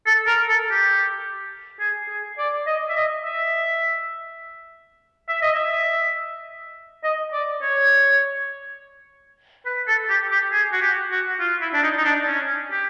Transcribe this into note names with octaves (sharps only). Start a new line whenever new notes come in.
A4
A#4
A4
G4
G#4
G#4
D5
D#5
E5
D#5
E5
E5
D#5
E5
D#5
D5
C#5
B4
A4
G4
G4
G#4
F#4
G4
F#4
F4
E4
D4
D#4
D#4
D4
C#4
G4